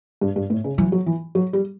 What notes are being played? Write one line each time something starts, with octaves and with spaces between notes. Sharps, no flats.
G2
G2
A2
C#3
E3 F#3
F#3
E3
F#3
G3